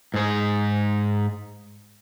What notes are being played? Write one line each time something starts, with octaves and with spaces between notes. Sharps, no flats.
G#2 G#4